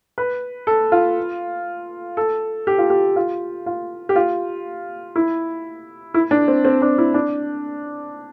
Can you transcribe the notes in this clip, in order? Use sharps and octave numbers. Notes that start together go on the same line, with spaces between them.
B4
A4
F4
A4
G4
F4
G4
F4
F4
G4
F4
E4
E4
D4
C4
C4
D4
E4
D4